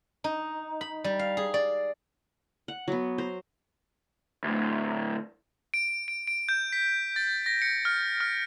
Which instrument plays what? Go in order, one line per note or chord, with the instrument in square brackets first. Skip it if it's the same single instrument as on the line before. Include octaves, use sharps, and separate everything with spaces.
[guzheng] D#4
B5
G3
F5
G#4
D5
[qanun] F#5
F#3 B3
C5 A#5
[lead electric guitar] D2 A2
[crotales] D7
D7
D7
G6
B6
A6
A#6
C#7
F6
F6